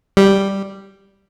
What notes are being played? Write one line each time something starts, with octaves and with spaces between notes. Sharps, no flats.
G3